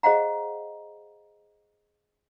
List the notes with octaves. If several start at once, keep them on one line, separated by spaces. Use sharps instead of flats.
G#4 C5 D#5 F5 F#5 A#5